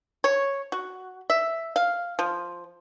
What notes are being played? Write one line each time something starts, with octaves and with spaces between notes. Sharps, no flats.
C#5
F#4
E5
F5
F3